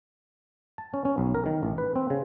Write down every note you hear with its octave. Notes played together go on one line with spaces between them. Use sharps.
A5
C#4
C#4
B1
A#4
D#3
A1
B4
C4
C#3